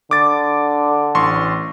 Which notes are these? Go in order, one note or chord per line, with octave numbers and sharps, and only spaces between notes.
D3 D6 A6
A1 C6 C#6